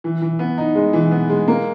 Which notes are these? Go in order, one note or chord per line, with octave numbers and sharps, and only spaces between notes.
E3
E3
B3
D#4
G#3
E3
B3
G#3
A#3